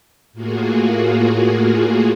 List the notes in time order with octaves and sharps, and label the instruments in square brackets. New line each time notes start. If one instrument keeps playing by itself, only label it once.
[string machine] A2 A#3 F4 F#4 G#4